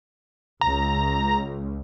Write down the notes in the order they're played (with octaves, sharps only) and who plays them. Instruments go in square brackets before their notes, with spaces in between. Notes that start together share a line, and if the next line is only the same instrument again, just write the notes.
[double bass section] C#2 [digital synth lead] A#5